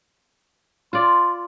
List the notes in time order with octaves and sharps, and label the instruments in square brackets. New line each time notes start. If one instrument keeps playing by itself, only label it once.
[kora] F4 D5 [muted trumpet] C6